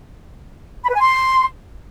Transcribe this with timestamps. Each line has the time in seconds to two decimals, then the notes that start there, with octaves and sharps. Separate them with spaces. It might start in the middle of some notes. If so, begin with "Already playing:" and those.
0.83 B5
0.89 B4
0.94 G#5
1.00 C6